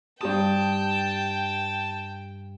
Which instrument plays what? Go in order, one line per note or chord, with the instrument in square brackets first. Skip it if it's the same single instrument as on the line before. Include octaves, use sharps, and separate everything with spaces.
[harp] G2 G4 D#6 [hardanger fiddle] G5 [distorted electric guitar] A5